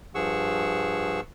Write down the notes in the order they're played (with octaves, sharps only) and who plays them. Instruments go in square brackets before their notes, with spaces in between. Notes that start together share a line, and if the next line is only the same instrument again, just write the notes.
[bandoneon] G2 F3 G#4 F#5 C#6 E6